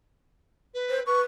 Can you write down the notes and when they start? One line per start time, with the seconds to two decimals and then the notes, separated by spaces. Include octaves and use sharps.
0.74 B4
0.89 C5
1.06 B4 C#6